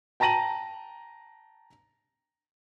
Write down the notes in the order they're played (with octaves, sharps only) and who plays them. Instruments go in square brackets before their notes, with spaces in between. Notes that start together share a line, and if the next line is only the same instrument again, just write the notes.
[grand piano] G5 A5 A#5 A#6 D#7 F#7